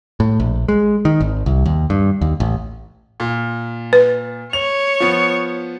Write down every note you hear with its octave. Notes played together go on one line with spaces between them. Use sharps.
A2
A#1
G#3
D#3
G#1
C2
D#2
G2
D#2
A1
A#2
B4
C#5 F7
F3 B3